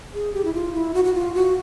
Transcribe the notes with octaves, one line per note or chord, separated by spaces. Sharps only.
G#4
G4
E4
F4
E4
F#4
F#4
F4
F#4